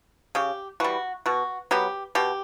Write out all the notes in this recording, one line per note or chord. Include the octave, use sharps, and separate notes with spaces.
C#3 G4
E3 G3 F#4
B2 F#4
F#3 B3 G4
B2 G4